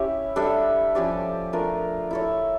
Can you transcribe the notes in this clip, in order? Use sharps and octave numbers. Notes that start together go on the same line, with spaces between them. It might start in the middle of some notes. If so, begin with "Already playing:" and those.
Already playing: C#4 E4 G4 C#5
G3 D4 A4 E5
F3 C#4 G4 D5
A3 D4 F4 A#4
E4 A4 C#5